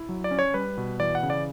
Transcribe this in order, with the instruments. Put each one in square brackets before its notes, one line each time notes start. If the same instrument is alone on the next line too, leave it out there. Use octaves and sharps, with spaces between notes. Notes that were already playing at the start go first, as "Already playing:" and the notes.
Already playing: [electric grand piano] E4
F#3
D5
C#4
C#5
G3 B4
B2
E3 D5
F#5
C#3
D5